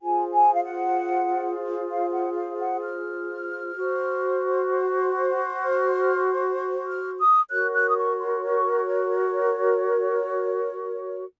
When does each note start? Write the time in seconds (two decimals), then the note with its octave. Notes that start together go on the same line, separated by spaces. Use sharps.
0.02 F4 G#4 C5 G#5
0.33 G#5
0.54 F5
0.64 F#5
1.89 F5
2.12 F#5
2.35 F5
2.59 F#5
2.82 F6
3.76 F#4 C5
5.63 F6
6.88 F6
7.19 D#6
7.49 F#4 A#4 C#5 F#6
7.74 F#6
7.89 D#6
7.97 C#6
8.20 C6
8.32 C6
8.43 C#6